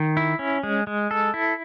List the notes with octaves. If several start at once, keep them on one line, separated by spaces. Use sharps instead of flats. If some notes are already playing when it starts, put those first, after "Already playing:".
Already playing: D#3
E4
C#4
G#3
G#3
A4
E4